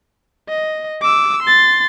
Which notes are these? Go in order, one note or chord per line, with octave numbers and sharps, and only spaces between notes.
D#5
D6 E6
C6 A6